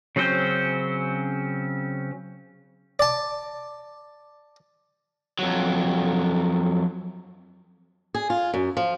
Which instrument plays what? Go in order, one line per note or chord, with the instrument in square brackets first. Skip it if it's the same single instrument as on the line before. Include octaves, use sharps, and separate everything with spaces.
[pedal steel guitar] C#3 F#3 C4 C#4 C5
[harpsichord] D5 A5
[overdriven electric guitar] F2 F#3
[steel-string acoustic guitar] G#4
F4
F#2
F3